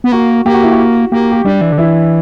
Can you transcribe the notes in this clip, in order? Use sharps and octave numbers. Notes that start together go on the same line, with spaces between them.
B3
A#3 F#4
A#3 G4
F#4
E4
F#4
A#3 G4
G4
G3 D4
E3
D3
E3 E4